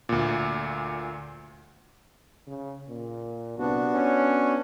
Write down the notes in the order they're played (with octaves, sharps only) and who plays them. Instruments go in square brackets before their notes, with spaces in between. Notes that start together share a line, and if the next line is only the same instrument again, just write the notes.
[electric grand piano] D2 A#2
[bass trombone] C#3
A#2
[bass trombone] C2 [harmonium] B3 D4 F#4
[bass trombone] C#4